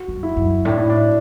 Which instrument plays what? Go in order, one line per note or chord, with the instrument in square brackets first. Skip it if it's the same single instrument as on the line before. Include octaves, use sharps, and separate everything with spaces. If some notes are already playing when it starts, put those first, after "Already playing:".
Already playing: [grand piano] F#4
[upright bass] F#2
[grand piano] E4
[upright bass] F#2
[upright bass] A2 [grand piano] D4
[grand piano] E4
D4